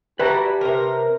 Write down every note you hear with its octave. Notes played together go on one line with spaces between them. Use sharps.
G3 E4 F#4 G4 B4 A5 A#5
C3 A#4